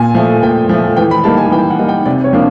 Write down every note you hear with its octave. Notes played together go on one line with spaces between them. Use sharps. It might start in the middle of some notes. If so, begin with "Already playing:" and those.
Already playing: A#2 G#5
F3 A3
A#2 G5
F3 A3
E3 G5
B5
G3 A#3 D#4 A5
G#5
E3 G5
F#5
G3 A#3 D#4
G5
C3 D5
C#5
F3 A#3 D4 F4